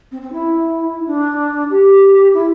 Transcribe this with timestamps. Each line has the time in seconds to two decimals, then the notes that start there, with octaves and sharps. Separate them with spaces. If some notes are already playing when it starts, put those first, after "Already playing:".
0.11 C4
0.22 C4
0.32 E4
1.06 D4
1.70 G4
2.33 E4